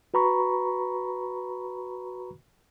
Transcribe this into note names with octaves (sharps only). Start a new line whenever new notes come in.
F#4 B4 A#5 B5 C#6